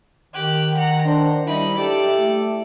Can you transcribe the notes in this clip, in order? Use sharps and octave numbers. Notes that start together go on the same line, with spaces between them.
D#3 G4 F#6
F#5 A#5
D4 C5
G3 D#4 E4 B5
G4 A4 D5
A3